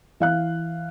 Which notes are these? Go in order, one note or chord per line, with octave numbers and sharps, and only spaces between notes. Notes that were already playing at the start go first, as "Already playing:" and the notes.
E3 F5 F#6